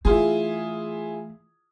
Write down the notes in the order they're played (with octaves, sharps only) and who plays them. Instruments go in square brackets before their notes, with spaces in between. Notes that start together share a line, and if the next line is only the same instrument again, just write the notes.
[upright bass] E3 A3 [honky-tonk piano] E4 F4 G#4